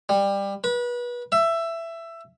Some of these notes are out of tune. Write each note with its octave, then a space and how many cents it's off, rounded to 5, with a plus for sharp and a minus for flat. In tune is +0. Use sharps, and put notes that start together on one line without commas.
G3 +20
B4 -30
E5 +15